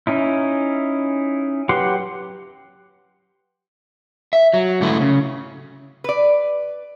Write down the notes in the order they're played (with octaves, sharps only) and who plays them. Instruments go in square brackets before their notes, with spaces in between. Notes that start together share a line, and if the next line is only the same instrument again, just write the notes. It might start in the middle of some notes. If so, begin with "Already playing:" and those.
[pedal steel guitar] C#4 D#4 E4
F#3 G4 B4 F#5 C6
[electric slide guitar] E5
F#3
G#2 D3 A3 E4 A4 B4
C#3
[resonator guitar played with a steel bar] B4 D5